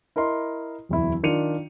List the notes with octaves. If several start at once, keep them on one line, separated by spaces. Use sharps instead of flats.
E4 A#4 D#5 C6
D1 E2 E4
D#3 D4 F4 C#7 D#7 F7